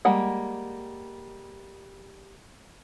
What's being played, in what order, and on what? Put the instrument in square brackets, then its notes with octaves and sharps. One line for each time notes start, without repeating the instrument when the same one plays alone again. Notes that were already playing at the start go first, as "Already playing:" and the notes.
[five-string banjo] G3 G#3 A#3 F#5